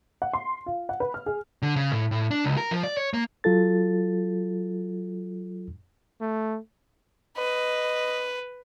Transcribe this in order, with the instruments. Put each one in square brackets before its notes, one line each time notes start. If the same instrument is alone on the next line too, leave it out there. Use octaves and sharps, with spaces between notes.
[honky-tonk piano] F#5
C6
F4
F#5
B4
F6
G#4
[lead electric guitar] D3
C#3
A2
A2
D4
C#2
A#4
F3
D5
C#5
A#3
[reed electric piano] F#3 F4 A4 A6
[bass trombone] A3
[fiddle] B4 [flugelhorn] D#5